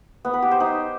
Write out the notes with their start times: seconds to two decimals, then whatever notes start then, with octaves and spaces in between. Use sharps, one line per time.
0.25 B3
0.33 B4
0.42 G4
0.51 C5
0.60 D#4